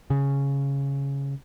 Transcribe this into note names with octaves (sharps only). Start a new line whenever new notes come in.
C#3